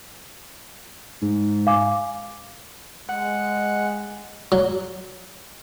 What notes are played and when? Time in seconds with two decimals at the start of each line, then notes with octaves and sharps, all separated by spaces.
1.22 G#2
1.67 F5 G#5 D6
3.09 G#3 F#5
4.52 F#3